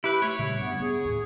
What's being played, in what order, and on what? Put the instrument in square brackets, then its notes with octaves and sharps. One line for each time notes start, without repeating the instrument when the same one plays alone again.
[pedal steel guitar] E4 B4 [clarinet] G4
[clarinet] A3 [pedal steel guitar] C#5
[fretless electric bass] A#2 C#3 G3 [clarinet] E5
[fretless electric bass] G2 [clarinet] B3
[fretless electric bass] B3 [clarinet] G#4
[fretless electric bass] D#2 A2